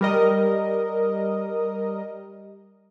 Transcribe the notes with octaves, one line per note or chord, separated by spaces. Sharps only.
G3 A#4 D#5